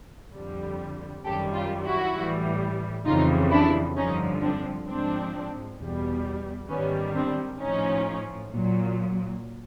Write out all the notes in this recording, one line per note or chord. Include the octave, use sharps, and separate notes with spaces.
F2 D3 G3
F#2 D#3 G3 G4 A4
F4 G4
E4 F#4
A2 E3 G3
F2 C#3 E3 G3 D#4 F4
D4 E4
G2 D3 F3 C#4 D#4
C4 D4
G#2 F3 C4 D4
E2 B2 G3
G#2 D#3 G3 B3 C#4
C4 D4
A2 F3 C#4 D#4
A#2 F#3